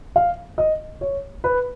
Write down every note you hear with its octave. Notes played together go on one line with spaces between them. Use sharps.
F5
D#5
C#5
B4